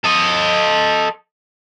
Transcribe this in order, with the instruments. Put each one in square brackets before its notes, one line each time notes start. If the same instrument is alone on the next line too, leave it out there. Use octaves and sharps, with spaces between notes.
[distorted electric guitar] A4 D#5